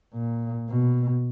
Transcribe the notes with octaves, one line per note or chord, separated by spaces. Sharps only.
A#2
B2